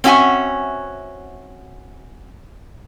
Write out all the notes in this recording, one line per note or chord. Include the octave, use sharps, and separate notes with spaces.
C4 C#4 F#4 E5 G#5